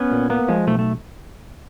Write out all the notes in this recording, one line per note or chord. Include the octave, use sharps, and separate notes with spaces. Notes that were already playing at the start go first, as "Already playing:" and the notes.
Already playing: B3 C#4
A#2
A#3 B3
F3 G#3
B1 A3
A3